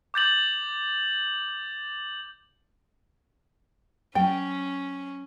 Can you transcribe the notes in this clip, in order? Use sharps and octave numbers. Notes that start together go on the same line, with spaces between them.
D6 G6 A6 F#7
F#3 C#4 G5